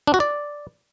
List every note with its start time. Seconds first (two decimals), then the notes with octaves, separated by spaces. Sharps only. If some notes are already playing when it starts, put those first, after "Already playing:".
0.07 D4
0.14 F#4
0.20 D5